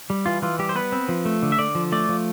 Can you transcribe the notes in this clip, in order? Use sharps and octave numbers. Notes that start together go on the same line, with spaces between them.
G3
E3 F4
E3 F4
G3 G4
C5
B3 B4
C4
F3
A3
D3
E5
D3 D5
F3
A3 D5
F3